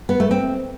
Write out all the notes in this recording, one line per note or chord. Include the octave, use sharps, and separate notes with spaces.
B3
A3
C4